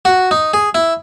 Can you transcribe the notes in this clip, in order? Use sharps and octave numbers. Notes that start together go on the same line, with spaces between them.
F#4
D#4
G#4
E4